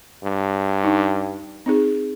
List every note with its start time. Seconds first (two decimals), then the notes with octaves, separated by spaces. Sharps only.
0.24 G2
0.84 D#4
1.66 C4 D#4 G#4